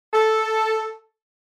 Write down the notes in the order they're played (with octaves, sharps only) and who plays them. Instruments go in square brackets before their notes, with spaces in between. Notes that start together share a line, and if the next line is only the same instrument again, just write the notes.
[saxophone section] A4